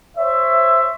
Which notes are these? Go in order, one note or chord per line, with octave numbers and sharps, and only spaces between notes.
C5 C#5 E5